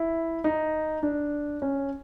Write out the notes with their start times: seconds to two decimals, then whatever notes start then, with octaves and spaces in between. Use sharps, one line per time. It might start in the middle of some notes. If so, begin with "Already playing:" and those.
Already playing: E4
0.44 D#4
1.03 D4
1.62 C#4